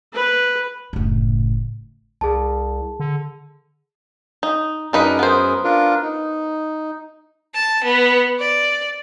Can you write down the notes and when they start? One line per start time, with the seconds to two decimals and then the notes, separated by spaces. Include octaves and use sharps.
0.13 B4
0.93 F#1 A2
2.21 C2 G#4 A5
3.00 D3
4.43 D#4
4.93 F#2 D4 D#4 G#4 A#4 B4
5.19 B3 C5
5.64 D4 F4 A#4
6.02 D#4
7.54 A5
7.84 B3
8.39 D5